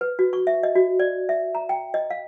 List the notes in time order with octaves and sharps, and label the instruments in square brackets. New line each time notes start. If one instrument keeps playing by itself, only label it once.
[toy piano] B4
F#4
C#6
E5
D#5
F#4
D5
E5
A#5
G5
D#5
F5